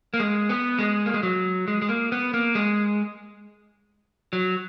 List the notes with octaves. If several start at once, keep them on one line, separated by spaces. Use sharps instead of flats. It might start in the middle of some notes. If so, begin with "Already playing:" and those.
A#3
G#3
B3
G#3
A#3
G#3
F#3
G#3
G#3
A#3
B3
A#3
G#3
F#3